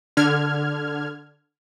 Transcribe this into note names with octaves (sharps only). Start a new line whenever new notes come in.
D3 F6 G#6